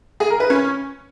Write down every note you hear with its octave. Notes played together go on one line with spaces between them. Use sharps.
G#4
A#4
B4
C#4